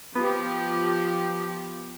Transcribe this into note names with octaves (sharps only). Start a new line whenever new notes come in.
F3 B3 G4